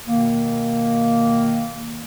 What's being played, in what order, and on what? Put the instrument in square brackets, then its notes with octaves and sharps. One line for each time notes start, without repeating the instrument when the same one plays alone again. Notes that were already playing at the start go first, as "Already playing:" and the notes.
[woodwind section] B2 D#3 A#3